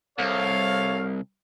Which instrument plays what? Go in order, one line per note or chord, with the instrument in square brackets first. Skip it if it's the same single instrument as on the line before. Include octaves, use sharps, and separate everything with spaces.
[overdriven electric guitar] C2 [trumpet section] A4 C#5 F5